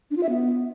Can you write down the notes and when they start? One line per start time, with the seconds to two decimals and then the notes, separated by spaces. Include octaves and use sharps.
0.11 D4
0.17 F4
0.23 E5
0.29 B3